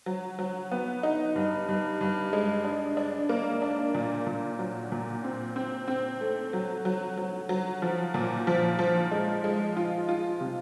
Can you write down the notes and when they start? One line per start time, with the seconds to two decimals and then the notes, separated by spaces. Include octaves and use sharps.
0.06 F#3
0.39 F#3
0.71 B3
1.03 D#4
1.36 G2
1.69 G2
2.01 G2
2.33 G#3
2.64 D4
2.97 D4
3.29 A#3
3.62 D4
3.95 A#2
4.26 A#2
4.59 F#3
4.92 A#2
5.24 C4
5.56 C4
5.88 C4
6.21 A3
6.53 F#3
6.85 F#3
7.17 F#3
7.49 F#3
7.82 F3
8.14 A#2
8.47 F3
8.79 F3
9.11 G#3
9.44 G#3
9.77 F4
10.09 F4
10.41 C3